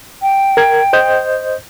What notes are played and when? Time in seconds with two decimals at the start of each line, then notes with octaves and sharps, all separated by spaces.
0.22 G5
0.57 A#4 G#6
0.93 C5 D#5 G6